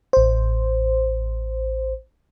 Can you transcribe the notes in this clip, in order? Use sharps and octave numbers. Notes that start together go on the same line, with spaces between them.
A1 C5